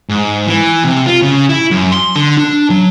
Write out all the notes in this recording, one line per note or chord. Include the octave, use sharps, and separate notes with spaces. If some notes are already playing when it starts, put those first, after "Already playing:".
G#2
E3
C3
F4
C#3
E4
F#2
C6
D3
D4
F#3